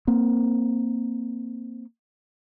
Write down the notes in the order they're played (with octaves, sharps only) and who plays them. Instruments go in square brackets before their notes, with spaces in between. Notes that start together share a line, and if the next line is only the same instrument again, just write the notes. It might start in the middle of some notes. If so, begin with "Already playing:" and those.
[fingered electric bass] A#3 C4